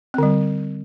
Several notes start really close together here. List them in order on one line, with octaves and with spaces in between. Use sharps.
C4 D3 G3